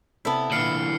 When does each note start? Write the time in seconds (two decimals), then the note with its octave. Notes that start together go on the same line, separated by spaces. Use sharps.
0.25 C3 B3 E4 A4
0.52 A#2 D3 E3 F6 C7 C#7